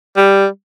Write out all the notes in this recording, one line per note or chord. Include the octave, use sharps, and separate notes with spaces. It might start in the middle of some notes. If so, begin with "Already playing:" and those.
G3